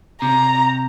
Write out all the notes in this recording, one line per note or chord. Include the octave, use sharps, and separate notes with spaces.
C3 A#5